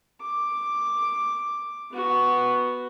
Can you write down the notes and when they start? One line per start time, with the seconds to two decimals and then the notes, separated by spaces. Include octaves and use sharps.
0.21 D6
1.92 B3 F#4